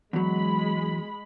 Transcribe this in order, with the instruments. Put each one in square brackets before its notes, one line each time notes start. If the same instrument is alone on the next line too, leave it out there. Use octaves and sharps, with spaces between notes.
[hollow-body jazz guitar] E2 F#3 [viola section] G#3 B5